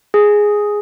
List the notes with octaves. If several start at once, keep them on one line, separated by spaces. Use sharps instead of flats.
G#4